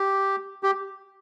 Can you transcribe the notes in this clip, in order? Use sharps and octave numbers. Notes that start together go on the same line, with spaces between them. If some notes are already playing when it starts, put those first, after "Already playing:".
Already playing: G4
G4